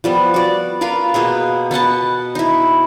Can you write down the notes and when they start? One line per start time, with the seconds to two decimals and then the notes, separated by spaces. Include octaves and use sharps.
0.04 F3 G3 B3
0.34 F#4 D5
0.81 F4 A#4 B4 F5
1.14 B2 A#3 B3 G#4
1.71 B3 D#5 F#5 A5
2.35 D#4 E4